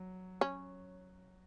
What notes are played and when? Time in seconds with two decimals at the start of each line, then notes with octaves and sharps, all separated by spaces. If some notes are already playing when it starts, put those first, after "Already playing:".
Already playing: F#3
0.41 C#4